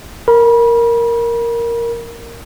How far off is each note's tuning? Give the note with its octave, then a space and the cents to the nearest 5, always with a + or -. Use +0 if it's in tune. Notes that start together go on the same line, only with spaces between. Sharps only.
A#4 +0 B5 -35